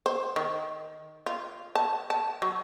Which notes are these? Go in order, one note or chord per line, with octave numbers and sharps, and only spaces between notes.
C5
D#3
F4
A5
A5
F#3